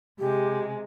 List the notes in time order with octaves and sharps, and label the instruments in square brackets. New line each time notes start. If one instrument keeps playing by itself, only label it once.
[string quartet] C3 G#3 [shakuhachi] G4